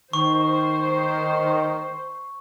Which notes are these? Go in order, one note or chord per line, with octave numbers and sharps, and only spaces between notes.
D#3 C5 C#6